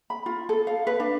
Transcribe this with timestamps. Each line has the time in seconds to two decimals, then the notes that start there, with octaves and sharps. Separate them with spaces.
0.10 B5
0.26 F4
0.49 A4
0.67 F5
0.87 B4
1.00 D4